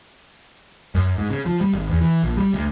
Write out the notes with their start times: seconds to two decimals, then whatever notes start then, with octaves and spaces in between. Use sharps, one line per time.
0.95 F#2
1.18 G#2
1.30 C#3
1.46 F3
1.61 G3
1.74 G#1
1.89 E2
2.01 E3
2.23 A#1
2.37 G3
2.54 D2